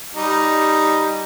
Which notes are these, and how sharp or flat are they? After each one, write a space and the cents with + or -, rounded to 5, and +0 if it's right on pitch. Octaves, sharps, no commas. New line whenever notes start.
G3 +0 D#4 +0